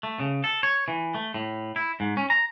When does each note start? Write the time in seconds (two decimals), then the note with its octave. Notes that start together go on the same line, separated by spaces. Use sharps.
0.03 A3
0.20 C#3
0.44 A4
0.63 C#5
0.88 E3
1.15 A3
1.34 A2
1.76 E4
2.00 G#2
2.17 C#4
2.30 A#5